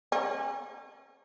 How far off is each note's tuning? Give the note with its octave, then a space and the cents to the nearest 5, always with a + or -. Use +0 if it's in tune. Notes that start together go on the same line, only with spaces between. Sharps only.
C#4 -35